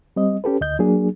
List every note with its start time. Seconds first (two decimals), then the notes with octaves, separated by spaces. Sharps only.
0.16 G3 C4 D#5
0.44 C#4 G4 A4 B4
0.61 D2 D#5 G6
0.79 F#3 A#3 D4 G#4